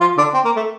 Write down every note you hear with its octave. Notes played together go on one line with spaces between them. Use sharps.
F3 F4
D3 D4
C4
A#3
A3